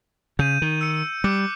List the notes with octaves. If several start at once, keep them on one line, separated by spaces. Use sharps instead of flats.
C#3 G6 D#7
D#3
E6 C#7
G3 D6 F#6 C#7